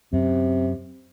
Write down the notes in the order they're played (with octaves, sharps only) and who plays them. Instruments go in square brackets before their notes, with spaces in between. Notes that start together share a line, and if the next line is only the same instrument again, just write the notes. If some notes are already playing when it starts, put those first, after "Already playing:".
[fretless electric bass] F#2 [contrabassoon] C3